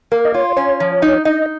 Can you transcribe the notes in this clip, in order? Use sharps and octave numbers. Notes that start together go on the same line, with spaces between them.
A#3 A#4
D#5
F4 C#5
C#4 C#5
F3
D#4
D#4 D#5